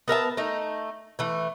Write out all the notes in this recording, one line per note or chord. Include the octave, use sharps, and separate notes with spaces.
B3 A#4 E5 A5
A3 D#4
E3 A3